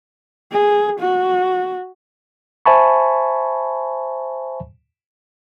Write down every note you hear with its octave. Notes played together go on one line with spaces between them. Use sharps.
G#4
F#4
C5 E5 G#5 A5 B5 C#6